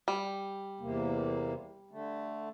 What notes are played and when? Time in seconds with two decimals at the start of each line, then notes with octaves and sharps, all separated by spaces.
0.08 G3
0.80 E2 C3 A#3
1.91 D3 A3